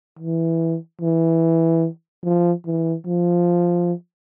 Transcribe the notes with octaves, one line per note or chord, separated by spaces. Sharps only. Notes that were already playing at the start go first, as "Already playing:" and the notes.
E3
E3
F3
E3
F3